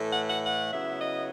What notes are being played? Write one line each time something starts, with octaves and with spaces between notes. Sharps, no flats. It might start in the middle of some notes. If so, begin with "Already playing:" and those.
Already playing: A2 E3 A3
F#5
F#5
F#5
C#3 F#3 B3 E4 E5
D#5